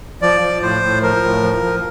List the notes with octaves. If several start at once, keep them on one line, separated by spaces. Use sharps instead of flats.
F3 D5
F3
A2 C5
A2
F3 A#4
A2
F3
F3